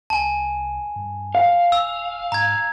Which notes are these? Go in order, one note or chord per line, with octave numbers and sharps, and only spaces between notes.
C2 G#5 A5
G2
F5
D1 E6
G#2 A#5 G#6